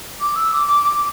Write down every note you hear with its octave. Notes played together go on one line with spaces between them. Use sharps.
D6
E6
D6
D6
D6